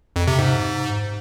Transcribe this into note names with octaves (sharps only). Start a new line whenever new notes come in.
F2
C3
G#2